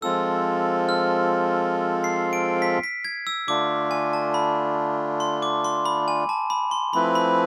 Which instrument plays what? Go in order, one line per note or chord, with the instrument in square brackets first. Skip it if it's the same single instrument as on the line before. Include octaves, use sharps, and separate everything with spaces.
[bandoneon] F3 G#3 C4 F4 A4 [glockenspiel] E6
[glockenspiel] F6
C7
D7
B6
B6
G#6
E6
[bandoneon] D3 A3 D4 F4 [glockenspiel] D6
[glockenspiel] G#5
A5
B5
C6
D6
C6
B5
G#5
A5
B5
C6
[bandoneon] F3 A3 C4 E4 B4 [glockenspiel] B5
[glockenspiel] B5